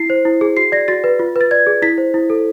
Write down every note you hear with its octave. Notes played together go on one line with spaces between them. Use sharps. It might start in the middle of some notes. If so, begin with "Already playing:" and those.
Already playing: E4 C7
C5
E4
G#4
F#4 C7
D5 A#6
F#4 A6
B4
F4
B4
A6
D5 G#6
G#4
E4 B6
C5
E4
A4